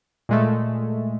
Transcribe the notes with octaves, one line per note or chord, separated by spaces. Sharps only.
A#2 G#3 A3